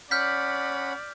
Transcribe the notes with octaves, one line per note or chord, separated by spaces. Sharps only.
C#4 D5 F#5 B5 F6 G6 B6